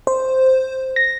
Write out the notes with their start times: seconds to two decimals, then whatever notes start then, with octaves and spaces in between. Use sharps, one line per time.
0.07 C5
0.96 A#6